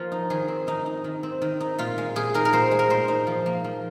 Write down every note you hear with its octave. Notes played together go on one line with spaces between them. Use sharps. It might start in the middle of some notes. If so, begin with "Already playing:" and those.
Already playing: F3 A#3 F4
D#4
D#3 G#4
C4
D#3 D#4
D#4
D#3
C4
D#3
D#4
A#2 F4
G#3
A#2 G#4
D#4 A#4
A#4
A#2 C5
G#3
A#4
A#2 C5
D#4
F3
A#3
F3